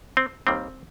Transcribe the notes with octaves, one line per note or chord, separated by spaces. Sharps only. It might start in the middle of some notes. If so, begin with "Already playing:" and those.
C4
D#2 D#3 G3 A#3 C4